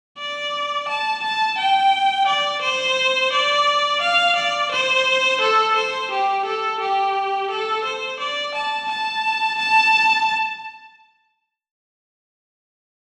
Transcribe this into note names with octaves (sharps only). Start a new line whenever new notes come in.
D5
A5
A5
G5
D5
C5
D5
F5
D5
C5
A4
C5
G4
A4
G4
A4
C5
D5
A5
A5
A5